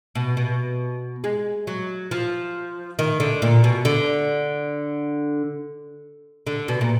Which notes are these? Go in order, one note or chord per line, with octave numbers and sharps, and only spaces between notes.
B2
B2
G#3
F#3
F3
D#3
D3
A#2
B2
D3
D3
B2
A#2